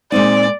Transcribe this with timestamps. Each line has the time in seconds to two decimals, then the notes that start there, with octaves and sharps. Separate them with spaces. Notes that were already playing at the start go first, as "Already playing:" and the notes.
0.12 A#2 G#3 C4 D#4 D5